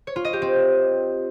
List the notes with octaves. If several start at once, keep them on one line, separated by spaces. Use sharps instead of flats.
C#5
F4
D#5
G4
C4